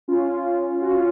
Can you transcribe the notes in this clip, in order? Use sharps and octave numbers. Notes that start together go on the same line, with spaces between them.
C#4 F4
F#4
C#4 F4